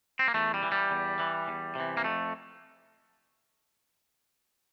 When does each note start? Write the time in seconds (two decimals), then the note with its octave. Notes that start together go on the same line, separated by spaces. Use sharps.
0.19 C4
0.28 A#3
0.34 E2 A3
0.54 G3
0.63 E3
0.72 G3
0.91 E2
1.20 E3
1.48 E2
1.75 C3 E3
1.97 A#3
2.04 F2 A3